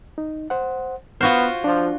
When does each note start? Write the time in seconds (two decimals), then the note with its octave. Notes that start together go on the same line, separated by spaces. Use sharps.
0.18 D#4
0.50 C5 F#5
1.21 B3 F4 F#4 C5 F6
1.64 F3 D4